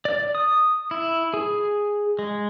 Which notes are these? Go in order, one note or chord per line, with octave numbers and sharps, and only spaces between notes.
D5
D#6
E4
G#4
G#3